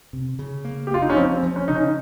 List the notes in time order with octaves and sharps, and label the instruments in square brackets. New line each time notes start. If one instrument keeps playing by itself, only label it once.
[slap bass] C3
C#3
A#3
[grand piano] G4
[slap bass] A#3 [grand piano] F4
[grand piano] D#4
C#4
[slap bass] F3 [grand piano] C4
[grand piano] C4
[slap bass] F3
[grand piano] C#4
[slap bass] C#3 [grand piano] D#4
[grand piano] C#4